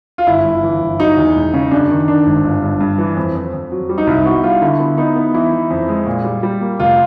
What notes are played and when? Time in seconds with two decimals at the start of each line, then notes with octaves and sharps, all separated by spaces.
0.18 F4
0.27 G1 E4
0.45 G1
0.63 E3
0.81 G1
0.99 F#3 D#4
1.18 E2
1.35 E1
1.53 C#3
1.71 F#2 D4
1.90 D#3
2.08 D#3 D4
2.26 G#1
2.44 G1
2.62 G2
2.81 G2
2.98 E3
3.17 F2
3.35 F2
3.53 F2
3.72 F#3
3.89 G3
3.98 D#4
4.07 C2 E4
4.25 B3 F#4
4.43 G3 F4
4.62 D3 E4
4.80 B3
4.98 B3 D#4
5.16 B3
5.34 E3 E4
5.52 E3
5.70 F2
5.89 G#3
6.07 A#2
6.24 G3
6.43 G3
6.61 A#3
6.79 F1 F4